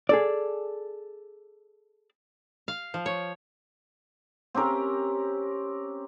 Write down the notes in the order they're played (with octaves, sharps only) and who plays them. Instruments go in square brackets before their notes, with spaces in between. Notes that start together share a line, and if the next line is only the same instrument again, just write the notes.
[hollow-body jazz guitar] G#4 A4 D5
[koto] F5
F3
C#5
[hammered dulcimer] C4 C#4 G4 A#4